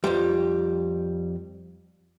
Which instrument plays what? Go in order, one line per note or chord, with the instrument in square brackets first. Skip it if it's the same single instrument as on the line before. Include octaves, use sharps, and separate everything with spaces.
[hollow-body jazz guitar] F2 G3